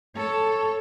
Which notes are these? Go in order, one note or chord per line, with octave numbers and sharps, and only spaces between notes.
A4 C#5